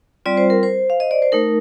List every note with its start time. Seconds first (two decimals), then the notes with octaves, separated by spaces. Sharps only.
0.26 G3 C4 F4 D5
0.37 C5
0.50 A#4
0.63 C5
0.90 F5
1.00 D#5
1.11 D5
1.22 C5
1.32 A3 D#4 A#4